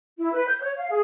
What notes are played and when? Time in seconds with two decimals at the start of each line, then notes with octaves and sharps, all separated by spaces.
0.18 E4
0.33 B4
0.47 G6
0.61 C#5
0.77 F5
0.90 G#4